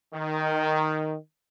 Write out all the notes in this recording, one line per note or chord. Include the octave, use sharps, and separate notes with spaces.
D#3